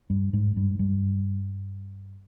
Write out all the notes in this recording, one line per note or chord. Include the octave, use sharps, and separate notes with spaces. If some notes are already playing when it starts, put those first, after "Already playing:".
G2 G3
G#2 G#3
G2 G3
G2 G3